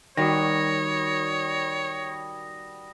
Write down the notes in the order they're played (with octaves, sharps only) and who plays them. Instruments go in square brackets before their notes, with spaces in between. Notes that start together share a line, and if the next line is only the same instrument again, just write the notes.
[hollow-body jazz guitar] D#3 [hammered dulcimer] G3 F#4 [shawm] C#5 [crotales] D#6 A#6